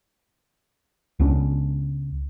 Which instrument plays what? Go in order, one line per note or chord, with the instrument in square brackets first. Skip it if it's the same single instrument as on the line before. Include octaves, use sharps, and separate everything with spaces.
[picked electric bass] C#2 B3 C#4 D4